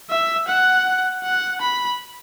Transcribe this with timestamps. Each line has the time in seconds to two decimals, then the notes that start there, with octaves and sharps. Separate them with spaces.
0.10 E5
0.48 F#5
1.24 F#5
1.61 B5